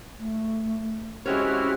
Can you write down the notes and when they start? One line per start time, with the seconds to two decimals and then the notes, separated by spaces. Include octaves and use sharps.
0.19 A3
1.26 G#3 C4 C#4 E4 F#4 G4 C#5 F6